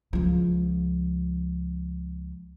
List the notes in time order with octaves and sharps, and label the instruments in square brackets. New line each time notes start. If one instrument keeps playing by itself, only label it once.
[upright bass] C#2 F3